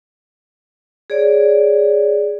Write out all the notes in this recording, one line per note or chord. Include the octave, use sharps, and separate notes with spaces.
G#4 C#5 D5